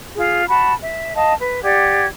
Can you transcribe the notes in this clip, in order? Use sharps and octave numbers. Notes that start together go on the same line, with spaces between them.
F4 G#4
F#4 A5 B5
E5
D#5 F5 A5
B4
G4 D5 F#5 G#6